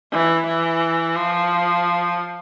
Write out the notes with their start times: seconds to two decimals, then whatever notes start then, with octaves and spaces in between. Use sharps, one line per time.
0.12 E3
0.47 E3
1.16 F3